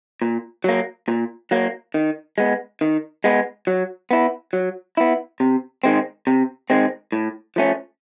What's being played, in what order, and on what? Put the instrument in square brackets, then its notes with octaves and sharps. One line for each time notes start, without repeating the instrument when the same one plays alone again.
[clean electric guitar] A#2
F#3 A#3
A#2
F#3 A#3
D#3
G#3 B3
D#3
G#3 B3
F#3
B3 E4
F#3
B3 E4
C3
D#3 G#3 C4
C3
D#3 G#3 C4
A2
F3 A3 C#4